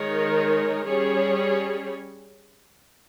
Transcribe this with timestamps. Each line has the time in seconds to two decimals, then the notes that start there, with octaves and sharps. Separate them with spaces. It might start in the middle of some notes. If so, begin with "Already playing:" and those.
Already playing: D#3 G#3 D#4 A#4 C#5
0.84 G3 C#4 G#4 C#5